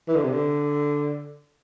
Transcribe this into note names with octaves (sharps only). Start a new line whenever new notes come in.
E3
D3
C3
D3